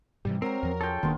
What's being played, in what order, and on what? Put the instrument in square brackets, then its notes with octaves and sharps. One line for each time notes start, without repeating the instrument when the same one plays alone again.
[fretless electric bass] G#2 C3 E3 [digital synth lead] G3
[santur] F#3 A#5 [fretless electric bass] G#3 [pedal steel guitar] C4 [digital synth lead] A#4
[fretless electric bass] E2 F3
[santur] C#4 F4 G#4 [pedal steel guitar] A4 G5
[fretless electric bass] D#1 A#3 D4 [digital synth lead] D#3 [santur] B3 F4 C6